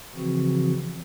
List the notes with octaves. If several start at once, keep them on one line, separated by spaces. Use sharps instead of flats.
C#3 E3 F3 C4 F#4